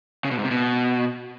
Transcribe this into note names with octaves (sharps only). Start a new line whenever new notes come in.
C#3
B2
G#2
C3
B2